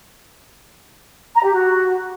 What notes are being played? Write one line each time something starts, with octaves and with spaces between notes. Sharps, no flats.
A#5
G4
F#4